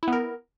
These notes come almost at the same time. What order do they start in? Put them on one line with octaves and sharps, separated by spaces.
E4 B3 A#4